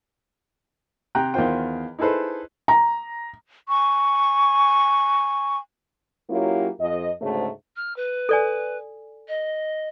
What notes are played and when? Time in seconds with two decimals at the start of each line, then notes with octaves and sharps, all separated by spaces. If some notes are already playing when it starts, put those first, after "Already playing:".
1.15 C3 G5 A#5 F#6
1.34 E2 D#3 F4 C5 G5
1.99 D#4 E4 G#4 A4 B4 C5
2.68 A#5
3.69 G#5 C#6
6.29 F#3 A#3 C#4 E4 F4 G4
6.79 F2 D#5
7.21 D2 G#2 C#3 A3
7.76 F6
7.96 B4
8.29 A4 D5 G#5
9.28 D#5